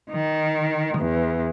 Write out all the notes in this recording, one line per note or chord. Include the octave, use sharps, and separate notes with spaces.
D#3
E2